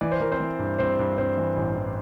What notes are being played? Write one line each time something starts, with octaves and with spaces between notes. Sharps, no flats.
E3 D5
C5
E3 A#4
C4 C5
E3
G2
G2 C4 C5
G2
G2 C4 C5
E3
A1
E3